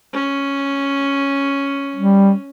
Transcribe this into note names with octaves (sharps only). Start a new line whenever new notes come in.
C#4
G3